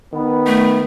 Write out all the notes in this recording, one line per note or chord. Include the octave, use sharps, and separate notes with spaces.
D#3 B3
A3